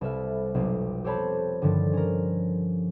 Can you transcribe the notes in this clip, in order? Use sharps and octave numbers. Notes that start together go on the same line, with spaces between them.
C2 A4 B4 E5 F6
F1 B1 C4
G4 A4 C5 C#5 A5 B5
G2 D3 D#3 F3 A6
C#4 A#4